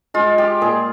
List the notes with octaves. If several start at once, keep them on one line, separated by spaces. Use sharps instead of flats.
G#3 F4
G4
A#2 G#4